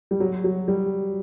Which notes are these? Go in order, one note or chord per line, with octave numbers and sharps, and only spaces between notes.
G3
F#3
F#3
G3